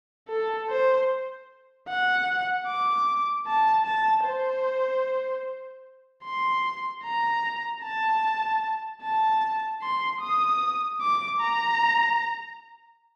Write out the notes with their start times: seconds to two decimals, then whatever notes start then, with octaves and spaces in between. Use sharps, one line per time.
0.29 A4
0.69 C5
1.88 F#5
2.67 D6
3.47 A5
3.86 A5
4.26 C5
6.24 C6
7.05 A#5
7.83 A5
9.03 A5
9.82 C6
10.21 D#6
11.01 D6
11.41 A#5